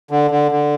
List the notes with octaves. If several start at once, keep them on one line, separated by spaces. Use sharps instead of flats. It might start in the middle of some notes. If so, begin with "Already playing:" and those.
D3
D3
D3